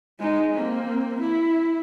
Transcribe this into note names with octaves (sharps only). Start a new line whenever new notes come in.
G#3 D#4
A#3 C4
E4